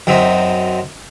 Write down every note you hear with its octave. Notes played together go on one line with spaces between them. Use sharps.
F#2 F#3 C4 D#4 E5